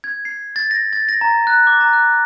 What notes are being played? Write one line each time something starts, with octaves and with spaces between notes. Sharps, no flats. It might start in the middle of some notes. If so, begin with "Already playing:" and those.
G#6
C7
A6
A#6
A6
A#6
A#5
F#6
D6
A#5
F#6